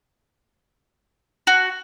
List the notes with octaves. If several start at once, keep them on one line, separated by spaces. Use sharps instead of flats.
F#4